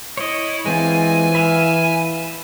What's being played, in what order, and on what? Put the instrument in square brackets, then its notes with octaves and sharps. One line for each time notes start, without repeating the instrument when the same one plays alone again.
[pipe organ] E4 [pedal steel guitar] C#5 D#5
[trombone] E3 [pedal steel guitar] G#3 C4 F4 [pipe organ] G#5
[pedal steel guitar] B4 E5 F5